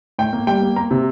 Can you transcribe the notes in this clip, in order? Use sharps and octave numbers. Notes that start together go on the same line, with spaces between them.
A2 G5
A#3
G3 G5
A#3
A#3 A#5
C3